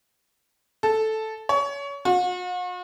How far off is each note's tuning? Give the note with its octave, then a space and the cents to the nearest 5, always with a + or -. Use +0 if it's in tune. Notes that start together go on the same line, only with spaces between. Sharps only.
A4 -5
C#5 +25
F#4 -45